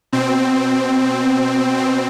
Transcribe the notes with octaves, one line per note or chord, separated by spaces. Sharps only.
B2 C4
B2 C4